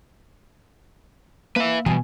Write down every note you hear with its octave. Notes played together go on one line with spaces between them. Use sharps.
A#3 B4 E5
B2 E3 F3 G3 G#5